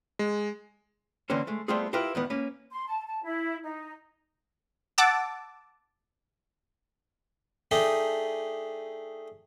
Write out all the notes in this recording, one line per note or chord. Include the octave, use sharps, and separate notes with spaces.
G#3
D3 E3 A#3 C4 C#4 C5
G#3 A3
G3 A3 B3 C4 F4 G#4
E4 F4 G4 A#4 B4
E2 D#3 B3
A#3 C#4 B4
C6
A5
A5
E4
D#4
F#5 A5 D6 E6
A3 D4 D#4 G4 G#4